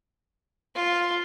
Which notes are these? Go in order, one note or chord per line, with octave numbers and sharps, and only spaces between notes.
F4